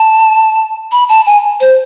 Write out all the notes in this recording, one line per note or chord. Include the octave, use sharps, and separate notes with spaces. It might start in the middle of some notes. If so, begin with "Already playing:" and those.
Already playing: A5
B5
A5
G#5
C5